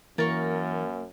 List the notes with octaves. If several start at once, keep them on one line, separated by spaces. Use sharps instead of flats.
F#2 E3 A#3 A#4 C#6 A6